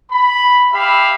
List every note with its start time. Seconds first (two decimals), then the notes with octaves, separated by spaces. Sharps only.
0.11 B5
0.72 G4 E5 F5 B5